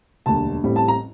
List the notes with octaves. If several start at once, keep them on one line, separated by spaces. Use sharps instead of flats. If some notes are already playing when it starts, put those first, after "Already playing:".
E1 D2 D3 G3 A#3 A5
A1 A2 G3 C4
A5
A#5